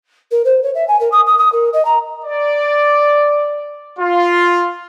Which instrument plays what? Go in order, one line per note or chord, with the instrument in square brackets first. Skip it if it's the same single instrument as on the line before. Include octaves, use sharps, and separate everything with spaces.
[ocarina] A#4
C5
C#5
E5
G#5
A#4
D#6
D#6
D#6
A#4
D#5
A#5
[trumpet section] D5
F4